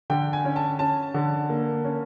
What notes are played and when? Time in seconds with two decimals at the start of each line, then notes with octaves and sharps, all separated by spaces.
0.10 D3 G5
0.33 G#5
0.45 C#4
0.56 A5
0.79 C#4 A5
1.14 D3
1.50 A#3
1.85 C#4